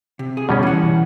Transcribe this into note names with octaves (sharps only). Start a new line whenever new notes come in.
C3
G#4
B2 G3 C#4
E3 F#5